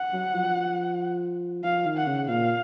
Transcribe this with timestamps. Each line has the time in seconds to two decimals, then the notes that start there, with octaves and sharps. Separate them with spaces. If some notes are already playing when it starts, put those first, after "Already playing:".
Already playing: F#5
0.13 F#3
0.35 F3
1.64 F3 F5
1.86 D#3
1.97 F#5
2.07 C#3
2.28 A#2 F5